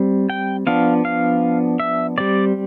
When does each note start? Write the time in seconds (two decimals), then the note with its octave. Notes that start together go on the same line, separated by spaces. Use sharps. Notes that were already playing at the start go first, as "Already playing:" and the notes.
Already playing: G3 C4
0.30 G5
0.67 F3 B3 D4 F5
1.05 F5
1.80 E5
2.18 G3 C4 D5